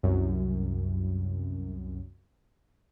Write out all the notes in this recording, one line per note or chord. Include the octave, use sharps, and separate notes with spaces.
C2 F#2